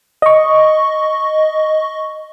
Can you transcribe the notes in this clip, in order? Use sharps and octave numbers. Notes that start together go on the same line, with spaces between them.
D#5 C#6